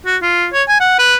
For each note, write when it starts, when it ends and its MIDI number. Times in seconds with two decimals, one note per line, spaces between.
0.06 0.17 66
0.22 0.47 65
0.53 0.63 73
0.68 0.76 80
0.80 0.94 78
0.99 1.15 71